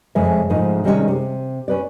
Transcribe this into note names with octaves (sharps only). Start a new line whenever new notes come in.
F2 C#3 G#3 E5
G#2 C#3 F3 A3 D#4
C3 D#3 G3 G#3 C4 C#4
C3
C#4 B4 D5